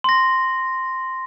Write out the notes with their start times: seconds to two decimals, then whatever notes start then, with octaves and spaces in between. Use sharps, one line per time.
0.04 C6 A#6